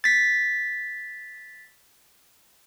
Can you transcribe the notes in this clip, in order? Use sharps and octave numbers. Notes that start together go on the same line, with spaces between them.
A6 B6